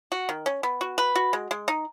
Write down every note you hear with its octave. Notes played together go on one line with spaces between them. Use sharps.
F#4
D#3
C#4
B3
F#4
B4
F#4
G#3
G#3
D#4